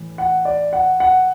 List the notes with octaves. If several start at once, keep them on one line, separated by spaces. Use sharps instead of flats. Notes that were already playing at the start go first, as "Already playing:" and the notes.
Already playing: A2 E3
F#5
D5
F#5
F#5